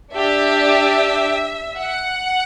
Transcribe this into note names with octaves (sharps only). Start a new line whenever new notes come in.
D4 G4 E5
F#5